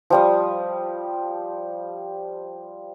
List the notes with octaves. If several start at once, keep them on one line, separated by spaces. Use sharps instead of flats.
F3 G3 D#6